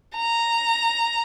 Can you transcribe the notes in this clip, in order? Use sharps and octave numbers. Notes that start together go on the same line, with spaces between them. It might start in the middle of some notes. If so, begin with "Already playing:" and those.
A#5